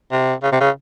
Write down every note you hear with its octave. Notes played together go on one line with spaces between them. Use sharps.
C3
C#3
C3
C#3